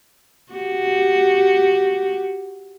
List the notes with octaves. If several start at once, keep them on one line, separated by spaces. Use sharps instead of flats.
F#4 G4